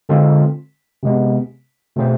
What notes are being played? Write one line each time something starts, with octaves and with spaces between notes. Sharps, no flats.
D3 G#3 C4 F4 A4
C3 G#3 B3
B2 A3 C4 G#4 C5